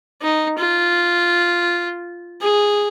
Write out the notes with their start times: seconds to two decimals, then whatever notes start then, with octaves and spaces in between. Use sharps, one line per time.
0.22 D#4
0.58 F4
2.41 G#4